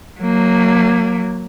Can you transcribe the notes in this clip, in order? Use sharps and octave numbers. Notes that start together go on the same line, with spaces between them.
F#3 A#3